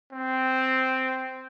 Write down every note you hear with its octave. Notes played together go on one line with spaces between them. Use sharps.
C4